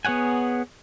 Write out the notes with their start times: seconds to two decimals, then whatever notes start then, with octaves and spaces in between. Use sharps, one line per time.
0.05 B3 G#4 C#5 F#5 G#5